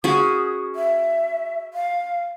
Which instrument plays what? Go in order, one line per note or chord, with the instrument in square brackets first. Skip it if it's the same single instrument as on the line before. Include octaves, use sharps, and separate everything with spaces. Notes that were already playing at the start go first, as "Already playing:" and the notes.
[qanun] C#4 F#4 G#4 [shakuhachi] D#6
[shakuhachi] E5
F5